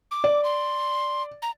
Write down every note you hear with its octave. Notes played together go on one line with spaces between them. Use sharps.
D6
D5
C6
A#5